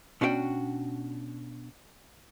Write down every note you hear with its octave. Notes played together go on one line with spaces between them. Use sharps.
B2 C#4 D4 F#4 D5 G5